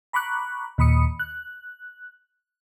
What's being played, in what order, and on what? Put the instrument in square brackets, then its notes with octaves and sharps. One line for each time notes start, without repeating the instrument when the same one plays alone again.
[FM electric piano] A#5 B5 C#6 D6 F#6
D#2 A#2 B5 D#6 C#7
F#6